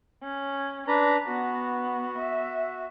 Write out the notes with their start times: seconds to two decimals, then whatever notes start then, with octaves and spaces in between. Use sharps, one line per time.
0.23 C#4
0.88 D4 B4 A#5
1.27 B3 F#4
2.18 E5